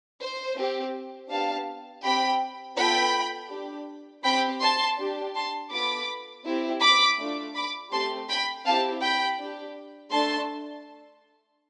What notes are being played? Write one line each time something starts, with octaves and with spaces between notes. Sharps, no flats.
C5
C4 G4
B3 D4 G4 F5 A5
C4 G4 G5 B5
B3 F4 A4 G5 B5
D4 G4
C4 G4 G5 B5
A5 C6
D4 G4
A5 C6
B3 F4 A4 B5 D6
C4 E4 G4
B5 D6
A3 D4 F4
B5 D6
A3 C4 G4 A5 C6
G5 B5
C4 E4 G4 F5 A5
G5 B5
D4 G4
A3 D4 A4 A5 C6